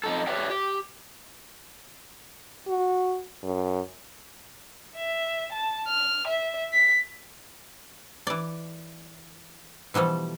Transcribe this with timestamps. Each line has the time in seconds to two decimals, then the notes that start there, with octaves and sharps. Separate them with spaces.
0.04 F2 D#4 A4
0.27 G4 B4 C#5 D5 E5 G5
0.50 G4
2.67 F#4
3.43 F#2
4.96 E5
5.52 A5
5.88 F6
6.27 E5
6.73 B6
8.27 E3 D5
9.94 B2 E3 F3 G3 A4